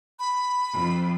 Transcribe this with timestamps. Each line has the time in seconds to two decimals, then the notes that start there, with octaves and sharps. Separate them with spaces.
0.19 B5
0.73 F2